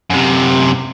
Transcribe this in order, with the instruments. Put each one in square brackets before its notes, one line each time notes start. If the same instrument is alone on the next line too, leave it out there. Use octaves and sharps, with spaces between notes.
[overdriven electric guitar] F#2 C3